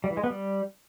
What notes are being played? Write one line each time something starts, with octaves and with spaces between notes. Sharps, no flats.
G3
E3
G#3
B3
G3